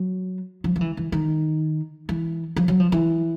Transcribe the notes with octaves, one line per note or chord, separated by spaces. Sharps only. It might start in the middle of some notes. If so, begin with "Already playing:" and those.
Already playing: F#3
F3
F3
E3
E3
D#3
E3
F3
F#3
F3
E3